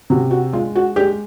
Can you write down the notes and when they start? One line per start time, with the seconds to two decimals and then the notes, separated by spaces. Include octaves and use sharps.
0.10 C3 F#4
0.31 F#4
0.53 G#3 F4
0.75 F#4
0.96 G#3 G4